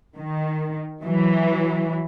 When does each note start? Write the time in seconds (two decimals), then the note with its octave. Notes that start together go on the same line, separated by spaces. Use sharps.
0.16 D#3
1.04 E3 F#3